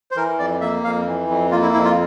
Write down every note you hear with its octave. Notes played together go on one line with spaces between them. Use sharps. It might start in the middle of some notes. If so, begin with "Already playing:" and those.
C5
E3 A#4
F2 D5
A#3 E5
F2 F5
E3
F2
A#3 F4
E4
F2 E4
F4